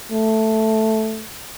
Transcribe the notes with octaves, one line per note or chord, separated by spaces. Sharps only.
A3